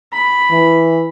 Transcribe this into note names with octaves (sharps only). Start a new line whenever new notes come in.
B5
E3